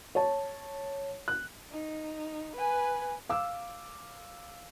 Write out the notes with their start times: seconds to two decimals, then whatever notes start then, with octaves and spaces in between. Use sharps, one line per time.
0.15 C#5 A5
1.28 F#6
1.72 D#4
2.56 B4 G#5
3.29 F5 D6 E6